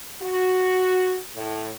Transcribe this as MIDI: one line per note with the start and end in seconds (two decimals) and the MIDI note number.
0.22 1.18 66
1.36 1.69 45